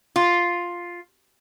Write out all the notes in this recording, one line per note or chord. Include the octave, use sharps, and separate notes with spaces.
F4